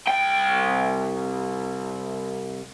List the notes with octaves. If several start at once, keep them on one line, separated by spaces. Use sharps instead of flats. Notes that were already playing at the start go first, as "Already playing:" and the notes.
C2 G5